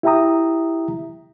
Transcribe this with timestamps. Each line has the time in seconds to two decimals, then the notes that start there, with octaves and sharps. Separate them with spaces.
0.03 E4 G4 E5 G5 A#5 D#6